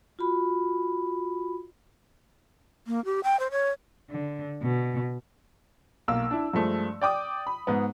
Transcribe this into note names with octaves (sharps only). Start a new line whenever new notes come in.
F4 F#4 B5
A#3
G4
G5
C5
C#5
D3
B2
B1 A#3 E6
D4 E4
G2 F3 G#3 A3
D5 G5 D6 D#6
B5
G#2 B3